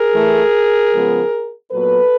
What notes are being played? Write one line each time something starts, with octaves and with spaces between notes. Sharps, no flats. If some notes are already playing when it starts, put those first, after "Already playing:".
Already playing: G#4 A#4
A2 E3 A3
C#3 F3 G#3 B3
A#2 F#3 B3 A4 B4